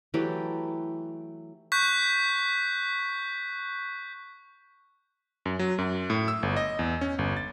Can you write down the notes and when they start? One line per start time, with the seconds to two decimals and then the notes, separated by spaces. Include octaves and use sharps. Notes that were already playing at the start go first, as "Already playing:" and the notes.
0.14 E3 F#3 A3 G4
1.72 C#6 F#6 G6 B6
5.46 F#2
5.59 F#3
5.78 F#2
6.10 A2
6.28 E6
6.43 G1
6.57 D#5
6.79 E2
7.01 C#4
7.19 G1
7.37 A6